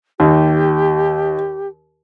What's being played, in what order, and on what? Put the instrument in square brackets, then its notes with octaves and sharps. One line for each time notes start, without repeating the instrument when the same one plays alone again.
[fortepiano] D#2 [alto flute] G4